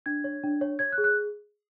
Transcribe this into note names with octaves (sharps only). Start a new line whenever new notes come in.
D4 G#6
C#5
D4
C#5
C#5 G#6
F#6
G#4
F#6